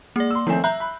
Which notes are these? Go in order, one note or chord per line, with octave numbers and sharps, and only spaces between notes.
G#3 A#3 D5
C6 E6
D#3 F3 A3 C4 G#5
E5 A#5 F#6 G6
B5